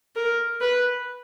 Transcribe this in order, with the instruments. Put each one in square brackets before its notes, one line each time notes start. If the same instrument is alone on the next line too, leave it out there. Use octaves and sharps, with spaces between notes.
[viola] A#4
B4